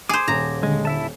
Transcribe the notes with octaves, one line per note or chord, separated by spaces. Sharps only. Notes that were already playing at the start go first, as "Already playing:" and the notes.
G#4 C5 D6
D#1 A#5
D3 G#3
E4 E5 A5